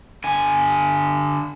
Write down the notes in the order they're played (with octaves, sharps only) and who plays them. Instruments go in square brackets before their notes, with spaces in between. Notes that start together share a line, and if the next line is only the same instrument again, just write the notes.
[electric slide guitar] D3 G#5